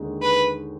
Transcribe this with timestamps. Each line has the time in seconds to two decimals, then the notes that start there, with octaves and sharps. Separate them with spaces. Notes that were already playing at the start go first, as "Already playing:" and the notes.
Already playing: D#2 D3 G#3 D#4
0.22 B4